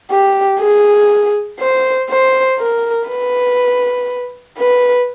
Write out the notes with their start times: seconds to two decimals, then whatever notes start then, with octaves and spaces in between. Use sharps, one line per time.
0.11 G4
0.60 G#4
1.60 C5
2.10 C5
2.59 A#4
3.09 B4
4.58 B4